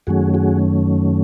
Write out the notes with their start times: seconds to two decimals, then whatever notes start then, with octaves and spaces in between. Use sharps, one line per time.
0.07 F#2 D#3 F#3 A3 C#4 F#4 G#4
0.34 F#4 G#4